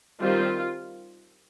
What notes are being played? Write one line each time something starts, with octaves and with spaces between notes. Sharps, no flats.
D#3 G3 C4 F4